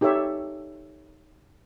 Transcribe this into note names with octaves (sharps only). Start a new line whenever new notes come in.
D#4 G4 A4 C#5 E5